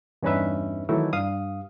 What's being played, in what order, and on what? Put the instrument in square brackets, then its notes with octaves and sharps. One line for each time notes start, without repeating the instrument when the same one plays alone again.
[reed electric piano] E2 G2 C#4 D#4 B4 E5
D#3 E3 F#3 A3 E4
G2 F5 D#6